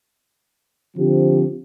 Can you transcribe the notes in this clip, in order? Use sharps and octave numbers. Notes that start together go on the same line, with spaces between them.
D3 F3 C4 G4